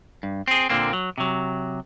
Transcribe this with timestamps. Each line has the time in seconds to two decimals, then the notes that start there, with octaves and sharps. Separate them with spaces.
0.23 G2
0.48 C4 G#4
0.70 A#2 D3 A#3 C4
0.93 F#3
1.18 C3 F#3